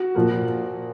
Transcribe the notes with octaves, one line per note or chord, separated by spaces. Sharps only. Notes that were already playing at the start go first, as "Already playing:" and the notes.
Already playing: F#4
A#2 F3 A#3